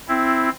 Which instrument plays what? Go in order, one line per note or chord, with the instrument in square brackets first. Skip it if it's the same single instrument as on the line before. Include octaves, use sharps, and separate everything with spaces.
[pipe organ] C4 E4